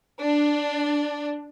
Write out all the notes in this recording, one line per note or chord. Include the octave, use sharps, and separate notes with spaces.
D4